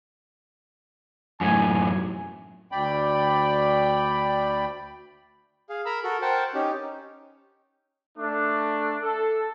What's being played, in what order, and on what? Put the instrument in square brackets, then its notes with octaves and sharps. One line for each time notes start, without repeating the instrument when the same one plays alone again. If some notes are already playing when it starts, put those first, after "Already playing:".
[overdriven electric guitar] F#2 A2 [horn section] G#5
[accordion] D2 D5 G5 B5
[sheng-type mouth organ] G#4 F5
A#4 A#5 B5 E6
F#4 A4 A#4
A#4 C5 F#5 G5 A5
C#4 D#4 G4
[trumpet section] A3 D4
A4